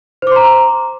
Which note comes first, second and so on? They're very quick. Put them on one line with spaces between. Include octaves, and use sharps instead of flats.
C5 D6 C6 A#5